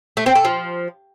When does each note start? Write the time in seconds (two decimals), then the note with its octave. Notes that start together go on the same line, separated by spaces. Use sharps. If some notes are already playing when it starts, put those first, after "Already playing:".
0.17 A3
0.26 C4
0.35 A4
0.45 F3